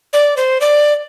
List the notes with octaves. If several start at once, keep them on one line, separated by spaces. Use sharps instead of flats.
D5
C5
D5